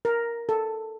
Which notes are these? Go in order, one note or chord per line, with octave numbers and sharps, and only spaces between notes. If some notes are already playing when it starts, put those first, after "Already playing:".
A#4
A4